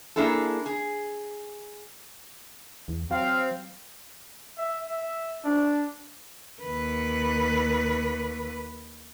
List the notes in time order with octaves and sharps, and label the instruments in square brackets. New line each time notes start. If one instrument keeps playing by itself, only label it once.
[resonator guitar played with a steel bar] A#3 D4 E4 G#4 A4
G#4
[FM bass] E2
[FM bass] F#3 [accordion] C4 [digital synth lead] F5
[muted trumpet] E5
E5
D4
[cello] D#2 B4